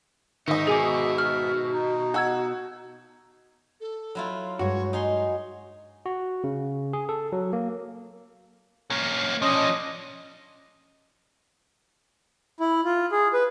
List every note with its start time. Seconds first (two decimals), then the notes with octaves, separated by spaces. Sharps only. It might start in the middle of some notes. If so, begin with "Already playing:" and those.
0.48 G#2 D#3 D#4 D#5 E5
0.67 B2 G#4 G#5 D6
1.18 F6
1.73 D#4
2.14 F#4 A5 E6 G#6
3.81 A4
4.15 F#3 E4 F4
4.59 G2 G#3 F#4 C#5
4.93 D#4 C#5 G#5 C6
6.06 F#4
6.44 C#3
6.93 G#4
7.09 A4
7.32 F#3
7.53 A#3
8.90 A#3 C#4
9.42 F3 C#4 D4 D#5
12.60 E4
12.85 F4
13.12 G#4
13.34 B4